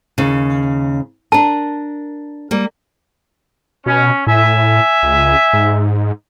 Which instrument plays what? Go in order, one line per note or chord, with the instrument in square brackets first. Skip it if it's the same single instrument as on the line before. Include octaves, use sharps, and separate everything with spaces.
[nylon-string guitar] D#2 C#3
[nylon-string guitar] D4 A#4 [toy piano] A5
[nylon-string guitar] G3 A#3
[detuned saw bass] B2 [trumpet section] C#4
[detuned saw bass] A2 [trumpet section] E5 G#5
[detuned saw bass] C#2
G#2